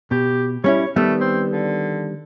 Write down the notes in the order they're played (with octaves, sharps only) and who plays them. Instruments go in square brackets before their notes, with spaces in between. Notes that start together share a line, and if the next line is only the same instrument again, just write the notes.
[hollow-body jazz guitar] B2 [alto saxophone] G4
[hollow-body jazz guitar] G3 C#4 E4 [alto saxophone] C#5
[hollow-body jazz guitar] D#3 G3 B3 [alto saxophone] A3
[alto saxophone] C4
D3